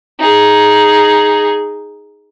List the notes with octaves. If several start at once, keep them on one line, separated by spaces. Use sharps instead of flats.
D#4 G#4